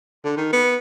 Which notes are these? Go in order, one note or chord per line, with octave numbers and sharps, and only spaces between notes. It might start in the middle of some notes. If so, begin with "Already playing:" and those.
D3
D#3
B3